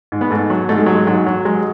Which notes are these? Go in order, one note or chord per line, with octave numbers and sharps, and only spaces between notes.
G#2
B3
G#2 A3
F#3
G#2 A3
G#3
F#3
G#3
G#2 F#3
F#3
F#3 G#3